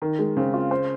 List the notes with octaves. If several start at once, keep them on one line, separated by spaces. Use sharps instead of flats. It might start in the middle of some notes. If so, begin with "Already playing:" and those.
D#3 A#4
G#3
C#3 C4
F4
C5